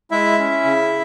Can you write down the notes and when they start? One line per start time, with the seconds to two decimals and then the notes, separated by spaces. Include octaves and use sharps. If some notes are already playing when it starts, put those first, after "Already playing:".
0.11 G#3 E4 E5
0.38 C#4
0.64 C#3